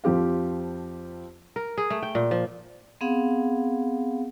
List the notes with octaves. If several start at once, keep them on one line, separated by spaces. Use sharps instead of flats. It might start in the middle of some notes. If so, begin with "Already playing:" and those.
F2 F3 C4 G4 F5
A#4
G#4
A3
G5
A#2
F3
B3 C4 G#4 F5 F#5